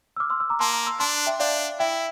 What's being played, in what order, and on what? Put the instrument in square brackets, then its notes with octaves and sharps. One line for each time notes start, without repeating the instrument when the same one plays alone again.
[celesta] E6
D6 F6
C6 E6
C6 E6
A#5 D6
[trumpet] A#3 [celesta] A5 C6
[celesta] A#5 D6
C6 E6
[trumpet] D4 [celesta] A5 C6
[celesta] E5 G5
[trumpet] D4 [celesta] D5 F5
[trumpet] E4 [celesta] E5 G5